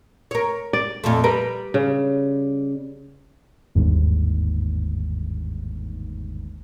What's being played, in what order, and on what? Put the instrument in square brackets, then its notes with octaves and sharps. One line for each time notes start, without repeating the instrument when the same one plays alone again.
[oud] A#4 C#5
[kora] D5
[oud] F2 A#2 A3
G3 A#4 B4
[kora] C#3
[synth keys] G1 D#2 G#2